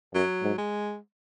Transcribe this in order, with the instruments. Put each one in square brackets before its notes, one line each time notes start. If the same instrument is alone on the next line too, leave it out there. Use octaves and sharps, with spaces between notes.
[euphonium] F#2 [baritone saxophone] F#3
[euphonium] G#2
[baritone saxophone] G#3